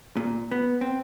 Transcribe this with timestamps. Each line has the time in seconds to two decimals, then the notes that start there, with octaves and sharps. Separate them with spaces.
0.17 A#2
0.51 B3
0.81 C4